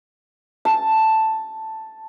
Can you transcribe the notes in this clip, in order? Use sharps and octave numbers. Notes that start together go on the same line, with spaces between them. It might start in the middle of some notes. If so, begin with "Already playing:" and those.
A5